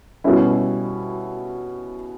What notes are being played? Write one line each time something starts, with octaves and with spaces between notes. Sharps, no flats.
B2 G3 C#4 E4